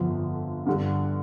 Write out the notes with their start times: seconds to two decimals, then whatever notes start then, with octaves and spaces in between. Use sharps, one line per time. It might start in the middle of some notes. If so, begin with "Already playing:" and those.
Already playing: G1 F2 D3 F3
0.66 G2 D3 G3